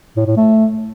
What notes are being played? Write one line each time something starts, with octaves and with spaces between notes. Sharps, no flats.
A2
A2
A3